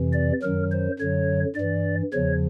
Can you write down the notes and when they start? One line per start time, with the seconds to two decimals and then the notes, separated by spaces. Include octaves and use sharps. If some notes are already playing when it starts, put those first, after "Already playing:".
Already playing: F2 C3 E3
0.13 D5
0.43 F#2 D#3 F#3 A#4
0.71 C5
0.99 F#2 D3 F#3 C#5
1.56 G2 E3 D5
2.13 E2 C#3 F3 C#5